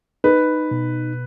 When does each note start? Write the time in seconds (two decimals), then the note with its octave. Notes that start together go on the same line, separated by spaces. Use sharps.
0.24 D#4 B4
0.71 B2